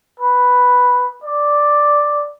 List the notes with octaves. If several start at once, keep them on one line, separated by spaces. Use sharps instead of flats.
B4
D5